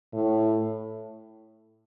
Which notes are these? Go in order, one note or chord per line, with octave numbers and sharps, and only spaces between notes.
A2